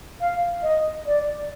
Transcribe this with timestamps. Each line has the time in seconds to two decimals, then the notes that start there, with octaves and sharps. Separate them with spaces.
0.20 F5
0.63 D#5
1.06 D5